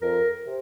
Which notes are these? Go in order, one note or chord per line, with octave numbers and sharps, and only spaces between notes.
F2 A#4
C3